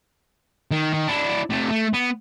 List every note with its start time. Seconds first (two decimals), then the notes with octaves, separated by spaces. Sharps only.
0.71 D#3
0.94 D#3
1.08 D4 E4
1.50 C3 A3
1.69 A3
1.93 B3